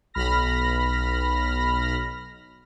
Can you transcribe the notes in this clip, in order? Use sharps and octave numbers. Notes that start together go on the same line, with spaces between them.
B1 B5 F6 A#6